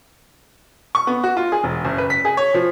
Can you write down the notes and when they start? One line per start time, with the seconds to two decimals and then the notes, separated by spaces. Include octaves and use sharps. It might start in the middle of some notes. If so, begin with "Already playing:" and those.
0.95 C#6
1.07 B3
1.24 F#4
1.37 F4
1.52 G#4
1.64 E1
1.85 F#1
1.98 B4
2.10 B6
2.25 G#4
2.37 C#5
2.54 F3